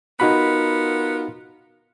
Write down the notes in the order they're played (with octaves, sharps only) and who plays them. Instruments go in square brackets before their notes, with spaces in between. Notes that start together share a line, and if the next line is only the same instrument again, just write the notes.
[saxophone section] B3 F4 A#4 [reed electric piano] D#4 F#4 B5